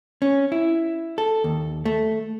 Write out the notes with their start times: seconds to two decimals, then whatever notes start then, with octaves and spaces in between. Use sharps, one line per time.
0.22 C#4
0.52 E4
1.18 A4
1.44 D#2
1.85 A3